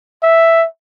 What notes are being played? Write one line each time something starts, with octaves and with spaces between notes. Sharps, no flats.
E5